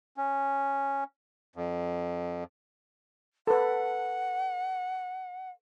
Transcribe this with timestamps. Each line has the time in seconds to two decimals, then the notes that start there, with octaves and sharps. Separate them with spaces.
0.17 C#4
1.56 F2
3.47 A4 B4 F#5